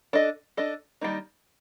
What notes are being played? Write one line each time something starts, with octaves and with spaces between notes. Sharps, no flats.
D4 A4 D#5
D4 A4 D#5
D#3 G3 A#3 D#4